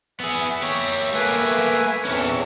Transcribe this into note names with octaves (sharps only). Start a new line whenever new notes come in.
B3 G#4 E5
G4 C#5
A3 A#3 B4 E5 G#5
E2 C3 E3 C#4 A4